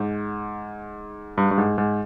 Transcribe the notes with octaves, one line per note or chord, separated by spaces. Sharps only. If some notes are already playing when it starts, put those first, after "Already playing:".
Already playing: G#2
G2
G2
G#2
G#2